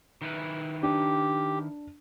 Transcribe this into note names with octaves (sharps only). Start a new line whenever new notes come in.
D#3 E4 B4
D4 G4